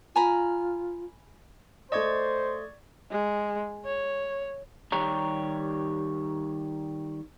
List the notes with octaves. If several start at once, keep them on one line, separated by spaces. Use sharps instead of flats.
F4 G#5 A#5 B5
A3 C5 D5 D#5 C#6 G#6
G#3
C#5
D#3 G3 G4 C#5 A#5